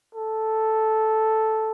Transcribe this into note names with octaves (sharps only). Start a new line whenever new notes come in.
A4